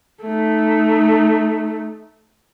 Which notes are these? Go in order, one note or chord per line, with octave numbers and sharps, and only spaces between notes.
A3 D#4